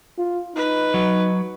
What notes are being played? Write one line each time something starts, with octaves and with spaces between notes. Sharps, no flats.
F4
D#4 B4
F#3